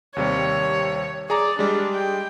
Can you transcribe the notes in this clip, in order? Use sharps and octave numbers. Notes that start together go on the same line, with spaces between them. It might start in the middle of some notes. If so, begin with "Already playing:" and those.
D#2 C3 G3 C#5
G#4 D5 A#5
G3 G#3 D4
G5